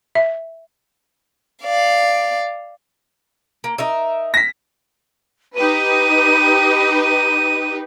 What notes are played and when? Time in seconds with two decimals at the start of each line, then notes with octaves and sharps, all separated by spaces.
0.15 E5
1.64 D5 F5
3.64 A#3
3.78 D#4 A#4 E5
4.34 A#6 B6
5.56 D#4 G4 B4 D#7
7.03 D#7